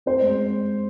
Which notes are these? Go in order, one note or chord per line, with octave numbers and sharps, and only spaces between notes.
C4 C5
G#3